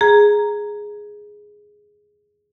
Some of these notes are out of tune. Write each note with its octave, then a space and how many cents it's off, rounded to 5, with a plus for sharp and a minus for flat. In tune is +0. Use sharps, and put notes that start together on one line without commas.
G#4 +0 A#5 +0